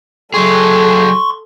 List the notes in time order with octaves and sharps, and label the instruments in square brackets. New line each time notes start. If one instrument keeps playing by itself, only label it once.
[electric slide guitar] F#3 G#4 [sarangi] A4 [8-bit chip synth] C6 C#6